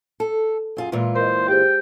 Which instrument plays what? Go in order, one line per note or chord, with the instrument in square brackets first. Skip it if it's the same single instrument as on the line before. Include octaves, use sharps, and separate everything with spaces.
[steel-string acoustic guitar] A4
F#2 F4 G#4
[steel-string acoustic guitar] A#2 E3 F4 [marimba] G#3
[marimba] A#4 D#5 [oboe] C5
[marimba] G4 G#4 C5 [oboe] G5